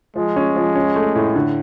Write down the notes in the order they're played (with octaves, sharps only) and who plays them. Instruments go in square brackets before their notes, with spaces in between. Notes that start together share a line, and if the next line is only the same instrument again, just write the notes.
[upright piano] F3 [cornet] G#3
[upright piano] C#4
F3
C#4
A3
A2
D3